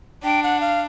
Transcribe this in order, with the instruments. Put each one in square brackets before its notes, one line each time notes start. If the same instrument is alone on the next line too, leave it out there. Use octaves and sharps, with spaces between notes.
[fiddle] D4 [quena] G5
[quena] F#5
F5